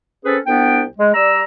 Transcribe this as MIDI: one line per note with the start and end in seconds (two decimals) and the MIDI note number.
0.23 0.37 60
0.23 0.37 61
0.23 0.37 68
0.23 0.37 69
0.23 0.37 71
0.46 0.84 36
0.46 0.84 59
0.46 0.84 62
0.46 0.84 79
0.97 1.13 56
1.14 1.43 55
1.14 1.43 74
1.14 1.43 82
1.14 1.43 88